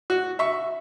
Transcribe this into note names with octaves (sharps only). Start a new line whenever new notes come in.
F#4
E5 C#6